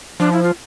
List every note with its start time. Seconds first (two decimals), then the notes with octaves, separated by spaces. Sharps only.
0.20 F3 D4
0.32 E4
0.43 F4